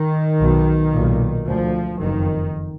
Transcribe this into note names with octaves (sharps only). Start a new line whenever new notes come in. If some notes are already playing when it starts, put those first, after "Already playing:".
Already playing: D#3
B1 B2
B1 A#2
D2 F3
F#1 F2 D#3